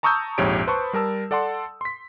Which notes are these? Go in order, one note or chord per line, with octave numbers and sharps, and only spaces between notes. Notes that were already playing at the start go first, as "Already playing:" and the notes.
A5 A#5 C#6 D#6 E6 G6
A#1 F2 G#2 G4 C#5 D7
B4 C5 A5 B5 C#6
G3 A#4 A5 E6
A4 D5 F#5 A5 C6
C6 B6